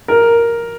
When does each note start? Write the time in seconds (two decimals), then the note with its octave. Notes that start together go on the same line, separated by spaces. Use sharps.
0.08 A#4